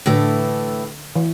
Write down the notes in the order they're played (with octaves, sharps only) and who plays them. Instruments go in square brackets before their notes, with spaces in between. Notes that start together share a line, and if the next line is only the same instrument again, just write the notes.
[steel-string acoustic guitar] A2 E3 A3 [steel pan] D3
[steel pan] E3